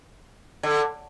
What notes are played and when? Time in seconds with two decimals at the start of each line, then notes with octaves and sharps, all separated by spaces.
0.63 D3